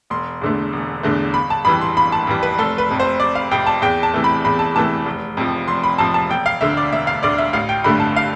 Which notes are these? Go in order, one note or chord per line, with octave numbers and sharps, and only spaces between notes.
E1 C6
E2 D3 A3
E1
E2 D3 A3
G1 B5
A5
F2 E3 G3 B5
C6
G1 B5
A5
F2 E3 G3
B4
F1 A4
B4
F2 C3
C5
F1 D5
F5
F2 C3 G5
A5
E2 G5
A5
C3 E3 A3
B5
E2 B5
A5
C3 E3 A3 A5
F1
F2 C3 F3
F1 C6
B5
F2 C3 F3 A5
A5
E1 G5
F5
D2 D3 E5
D5
E1 E5
F5
D2 D3 D5
E5
A1 F5
G5
G2 D3 A3 B5
A5
F5